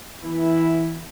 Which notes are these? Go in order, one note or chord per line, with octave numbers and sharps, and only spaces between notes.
E3 B3 E4